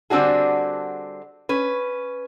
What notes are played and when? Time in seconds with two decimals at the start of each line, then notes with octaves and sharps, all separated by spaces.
0.10 D3 G3 C4 D4 F#4 G#4
1.49 C#4 B4